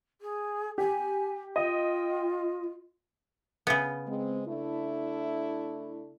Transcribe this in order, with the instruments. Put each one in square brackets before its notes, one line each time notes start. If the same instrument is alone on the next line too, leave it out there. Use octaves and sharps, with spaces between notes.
[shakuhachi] G#4
[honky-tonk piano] G4 [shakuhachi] G#5
[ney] F4 [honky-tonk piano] D#5 [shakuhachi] G5
[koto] C#3 B3
[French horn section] G#3 C4
A3 D4 E4